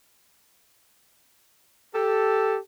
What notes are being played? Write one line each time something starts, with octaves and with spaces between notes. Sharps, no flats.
G4 A4